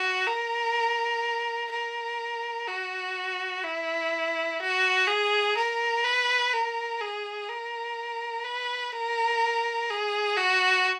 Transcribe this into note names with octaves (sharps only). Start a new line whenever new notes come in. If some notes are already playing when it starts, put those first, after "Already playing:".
Already playing: F#4
A#4
A#4
F#4
E4
F#4
G#4
A#4
B4
A#4
G#4
A#4
B4
A#4
G#4
F#4